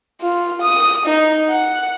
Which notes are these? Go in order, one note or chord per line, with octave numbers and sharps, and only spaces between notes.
F4
D#6
D#4
F#5